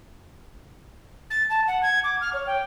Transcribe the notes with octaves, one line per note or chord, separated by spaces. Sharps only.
A6
A5
F#5
G#6
D6
F6
C#5
G5